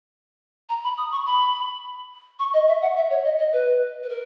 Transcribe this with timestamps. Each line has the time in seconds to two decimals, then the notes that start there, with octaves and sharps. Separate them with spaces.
0.69 A#5
0.84 B5
0.97 D#6
1.12 C#6
1.26 B5
2.39 C#6
2.53 D#5
2.68 E5
2.82 F#5
2.96 E5
3.10 C#5
3.24 D#5
3.38 D#5
3.53 B4
4.03 B4
4.09 A#4